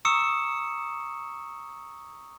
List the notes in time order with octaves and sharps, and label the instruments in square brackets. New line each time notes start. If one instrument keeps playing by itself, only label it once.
[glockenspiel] A#5 C#6 D#6 E6 C#7 E7